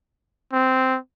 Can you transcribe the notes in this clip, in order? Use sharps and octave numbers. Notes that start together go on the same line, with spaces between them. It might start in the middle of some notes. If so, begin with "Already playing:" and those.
C4